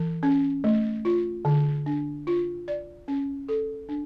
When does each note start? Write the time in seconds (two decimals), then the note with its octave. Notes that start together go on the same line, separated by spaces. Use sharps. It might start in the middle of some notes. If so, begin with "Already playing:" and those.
Already playing: E3
0.23 C#4
0.64 A3
1.05 F4
1.45 D3
1.86 D4
2.27 F4
2.68 D5
3.08 C#4
3.48 A4
3.89 D4